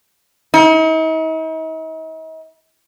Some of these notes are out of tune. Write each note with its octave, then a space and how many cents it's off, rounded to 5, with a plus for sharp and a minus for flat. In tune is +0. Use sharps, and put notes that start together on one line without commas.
D#4 +45